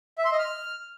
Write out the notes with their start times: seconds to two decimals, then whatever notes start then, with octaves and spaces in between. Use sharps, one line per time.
0.18 E5
0.25 C6
0.32 D#5
0.39 F6